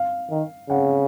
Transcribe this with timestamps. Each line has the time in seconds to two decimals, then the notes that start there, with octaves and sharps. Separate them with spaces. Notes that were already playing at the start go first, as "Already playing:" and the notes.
Already playing: F5
0.31 D#3
0.70 C#3 F#5